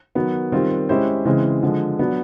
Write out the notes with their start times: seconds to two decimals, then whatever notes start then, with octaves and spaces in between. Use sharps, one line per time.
0.15 D#3 F#3 B3
0.52 D#3 G3 C4 F4
0.89 G#3 C#4 E4 G4 C5
1.25 C#3 E3 G#3 C4
1.63 D3 F3 G#3
1.99 F#3 B3 D4